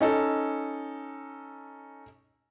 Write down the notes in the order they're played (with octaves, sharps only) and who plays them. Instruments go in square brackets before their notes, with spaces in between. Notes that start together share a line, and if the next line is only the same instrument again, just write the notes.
[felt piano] C#4 D#4 A4